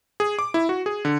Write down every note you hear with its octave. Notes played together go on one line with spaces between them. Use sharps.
G#4
D6
E4
F#4
G#4
D3